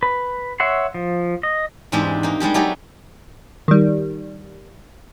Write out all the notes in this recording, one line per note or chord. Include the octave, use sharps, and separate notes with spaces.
B4
C#5 E5 F#5 C6
F3
D#5
E2 G#2 G#3 C4 D4 G4
A#3 D#4
G3 G#3 D4 G4
F#3 A3 D4 D#4 G4 G#4
D#3 G3